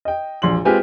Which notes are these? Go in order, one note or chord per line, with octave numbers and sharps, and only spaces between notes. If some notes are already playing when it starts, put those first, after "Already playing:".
D#5 G5
E1 A#1 C6 F#7
G#3 C4 F4 G4 B4 G#5